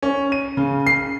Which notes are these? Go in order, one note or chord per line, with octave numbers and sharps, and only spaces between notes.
C#4
D#7
C#3
C7